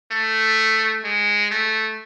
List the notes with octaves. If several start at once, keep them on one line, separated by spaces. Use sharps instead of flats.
A3
G#3
A3